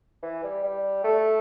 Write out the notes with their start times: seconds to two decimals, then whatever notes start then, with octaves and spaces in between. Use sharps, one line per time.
0.23 E3
0.43 G3
0.63 G3
1.04 A3